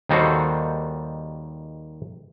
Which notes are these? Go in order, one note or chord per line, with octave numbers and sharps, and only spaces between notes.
D#2 D#3 G3 F#4 A4 C5